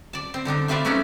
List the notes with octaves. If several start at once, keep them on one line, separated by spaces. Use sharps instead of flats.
D5 A5
C4
D3 C4 D4 D#4
A3 C4 F4 B4 D5 E5
A3 B3 C#4 D#4 A4 D5